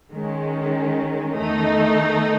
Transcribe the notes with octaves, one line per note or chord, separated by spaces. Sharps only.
D#3 G#3 C#4
E2 D#3 A3 D#4